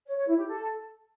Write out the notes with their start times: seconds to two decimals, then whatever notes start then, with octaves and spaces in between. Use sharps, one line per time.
0.06 C#5
0.17 C#5
0.27 E4
0.37 G4
0.48 A4